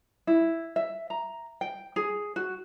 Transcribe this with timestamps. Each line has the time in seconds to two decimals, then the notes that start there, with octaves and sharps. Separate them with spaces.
0.27 E4
0.76 E5
1.10 A#5
1.61 G5
1.96 G#4
2.36 F#4